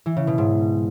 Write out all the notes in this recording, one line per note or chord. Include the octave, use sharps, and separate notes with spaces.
E3
C#3
B2
G#2